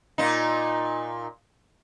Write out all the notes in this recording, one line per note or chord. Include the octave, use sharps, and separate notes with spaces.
A#2 D#4